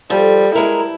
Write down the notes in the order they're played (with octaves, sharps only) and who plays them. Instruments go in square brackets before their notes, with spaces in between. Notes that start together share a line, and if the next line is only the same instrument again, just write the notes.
[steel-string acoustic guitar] F3 [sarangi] G3 [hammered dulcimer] A4 C5
[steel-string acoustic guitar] G#3 A#4 [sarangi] E4 [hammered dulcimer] B4